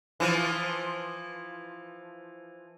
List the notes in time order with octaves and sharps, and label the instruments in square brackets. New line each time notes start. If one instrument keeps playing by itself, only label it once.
[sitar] E3 F3